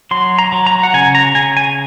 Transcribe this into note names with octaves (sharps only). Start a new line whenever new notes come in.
F#3 C6
A#5
F#3
A#5
F#5
C#3 G#5
A#5
C#3 G#5
G#5